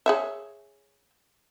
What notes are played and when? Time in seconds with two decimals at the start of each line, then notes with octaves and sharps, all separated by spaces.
0.06 G#4 C#5 E5